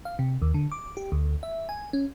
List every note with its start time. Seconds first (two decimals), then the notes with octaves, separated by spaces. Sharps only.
0.05 F5
0.19 C3
0.42 D#2
0.54 D3
0.72 D6
0.97 G4
1.12 D2
1.43 E5
1.69 G#5
1.93 C#4